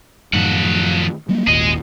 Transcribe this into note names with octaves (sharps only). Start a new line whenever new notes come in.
F#2 A2 D#3 F3 F#5
F#3 G3 A#3
G#1 D#2 A#2 G#4 D#5